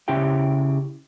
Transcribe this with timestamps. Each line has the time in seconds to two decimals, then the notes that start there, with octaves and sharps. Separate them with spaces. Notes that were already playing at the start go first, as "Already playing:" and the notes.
0.08 C#3 E4 G4 E5 G5